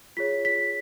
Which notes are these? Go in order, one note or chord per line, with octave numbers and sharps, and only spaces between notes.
F4 G#4 C#5 B6
B6